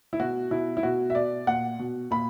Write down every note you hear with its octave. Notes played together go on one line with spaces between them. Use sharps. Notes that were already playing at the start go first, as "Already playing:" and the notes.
E4
B2 F#4
B2 E4
E4
B2 F#4
E5
B2 D5
A#2 F#5
B2
A#2 B5